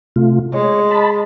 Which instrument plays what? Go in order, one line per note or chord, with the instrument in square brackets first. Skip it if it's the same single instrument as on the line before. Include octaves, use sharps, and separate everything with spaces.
[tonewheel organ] C3 A3 F4
[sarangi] G#3 [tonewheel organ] C#5
[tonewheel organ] A5 B5